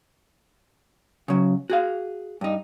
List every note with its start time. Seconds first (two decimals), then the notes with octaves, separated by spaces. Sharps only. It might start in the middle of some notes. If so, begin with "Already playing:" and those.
1.28 C#3 F#3
1.70 F#4 G#4 F5
2.41 G2 D#4